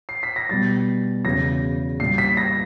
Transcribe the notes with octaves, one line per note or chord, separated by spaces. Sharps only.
C7
B6
A#6
B2 G3 A6
E2 C#3 F#3 A#6
A#2 G3 C7
B6
A#6